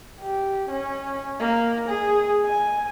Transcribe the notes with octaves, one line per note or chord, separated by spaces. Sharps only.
G4
C#4
A#3
G#4
G#5